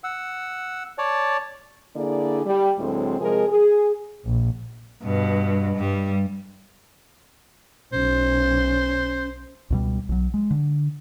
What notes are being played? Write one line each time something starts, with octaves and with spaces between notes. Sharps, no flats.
F#5 E6
C#5 D5 A5
D3 A#3 E4 G#4 D5
G3
D2 A2 F#3 G#3 C4
C3 F3 G#3 G#4 A#4
G#4
A#1
G2 B2
G2 G3
B1 C#4 C5
C#2 B2 G3
B1 F#3
G#3
D3